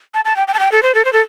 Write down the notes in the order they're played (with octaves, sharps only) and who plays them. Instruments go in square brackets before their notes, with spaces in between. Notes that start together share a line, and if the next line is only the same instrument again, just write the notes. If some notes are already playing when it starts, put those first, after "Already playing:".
[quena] A5
A5
G5
G5
A5
G5
A4
C5
A4
C5
A4